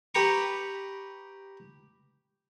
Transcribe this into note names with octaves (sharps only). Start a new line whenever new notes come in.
G4 B4 G5 A#5 C#6